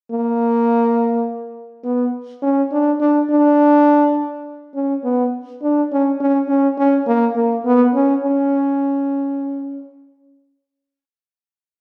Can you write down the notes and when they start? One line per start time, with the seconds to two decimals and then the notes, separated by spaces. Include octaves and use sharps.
0.11 A#3
1.85 B3
2.42 C#4
2.72 D4
3.00 D4
3.30 D4
4.75 C#4
5.04 B3
5.62 D4
5.91 C#4
6.20 C#4
6.48 C#4
6.77 C#4
7.07 A#3
7.36 A#3
7.65 B3
7.95 C#4
8.23 C#4